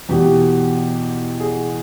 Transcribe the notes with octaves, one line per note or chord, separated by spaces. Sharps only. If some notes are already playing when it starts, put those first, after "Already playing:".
E2 B2 G4
G#4